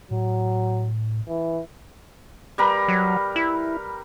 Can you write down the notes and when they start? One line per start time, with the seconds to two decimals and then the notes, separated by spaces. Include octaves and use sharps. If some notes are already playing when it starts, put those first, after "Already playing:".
0.11 A2 F#3
1.28 E3
2.58 G3 A#4 B4
2.88 F#3
3.36 E4